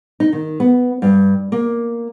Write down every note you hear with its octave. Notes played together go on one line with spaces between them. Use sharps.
D#4
D#3
B3
G2
A#3